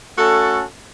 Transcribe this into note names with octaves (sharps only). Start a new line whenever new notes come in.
A3 C#4 F#4 A4